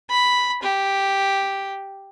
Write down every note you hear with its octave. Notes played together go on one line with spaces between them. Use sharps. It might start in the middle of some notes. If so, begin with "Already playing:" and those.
B5
G4